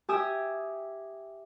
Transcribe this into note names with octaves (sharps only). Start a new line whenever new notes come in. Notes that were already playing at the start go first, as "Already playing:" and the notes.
G4 E5 G#5 D#6 E6